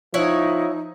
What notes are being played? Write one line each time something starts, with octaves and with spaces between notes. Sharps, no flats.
F3 D#4 E4 C#5 F#5